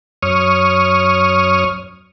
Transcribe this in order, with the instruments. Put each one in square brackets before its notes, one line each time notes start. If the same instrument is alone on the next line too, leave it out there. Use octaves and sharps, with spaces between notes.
[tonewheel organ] F#2 C#5 C#6 D#6 F6